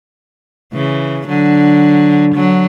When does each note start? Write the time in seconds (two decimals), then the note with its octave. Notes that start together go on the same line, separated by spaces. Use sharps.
0.73 C#3 E3
1.27 D3 F#3
2.34 D3 F#3